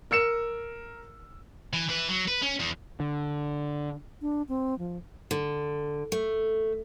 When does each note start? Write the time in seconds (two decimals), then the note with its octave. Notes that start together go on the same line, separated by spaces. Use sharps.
0.11 A#4 E6 C#7 E7
1.73 E3
1.89 E3 B4
2.09 F#3
2.28 B4
2.42 C#4
2.60 E2
3.00 D3
4.22 D4
4.49 C4
4.79 F3
5.31 D3
6.12 A3